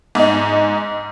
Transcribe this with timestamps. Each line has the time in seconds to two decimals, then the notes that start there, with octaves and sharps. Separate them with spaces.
0.15 G#2 D#4